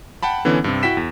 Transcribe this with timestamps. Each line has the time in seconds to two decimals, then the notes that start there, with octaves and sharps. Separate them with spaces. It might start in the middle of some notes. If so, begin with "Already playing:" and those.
0.23 F#5 G5 A5 B5
0.45 D3 E3 B3 C#4
0.64 G2 C3
0.83 E4 F#4 G5 B6 E7
0.97 E2